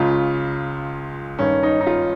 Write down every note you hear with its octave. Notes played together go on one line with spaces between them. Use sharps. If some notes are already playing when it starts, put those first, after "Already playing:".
Already playing: C#2 C#3 F4
G2 D#3 C#4
D#4
D#4
F4